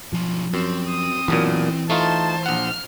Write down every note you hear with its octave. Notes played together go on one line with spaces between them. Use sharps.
B1 F3 F4
F#2 C4
D#6
B1 F#2 A#2 E3
A3 D#4 F4 C5 A5
A#1 F#5 F6